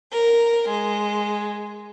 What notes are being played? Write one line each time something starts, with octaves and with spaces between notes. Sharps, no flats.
A#4
G#3